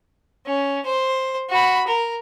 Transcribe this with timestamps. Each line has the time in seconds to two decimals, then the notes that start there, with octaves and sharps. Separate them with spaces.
0.46 C#4
0.86 C5
1.50 F#4 B5
1.87 A#4